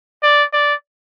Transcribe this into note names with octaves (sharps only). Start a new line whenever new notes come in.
D5
D5